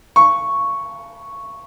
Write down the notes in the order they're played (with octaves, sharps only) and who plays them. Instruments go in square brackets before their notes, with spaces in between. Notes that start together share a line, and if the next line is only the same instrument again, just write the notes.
[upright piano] C#6